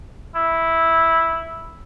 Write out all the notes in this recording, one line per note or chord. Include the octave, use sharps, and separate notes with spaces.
E4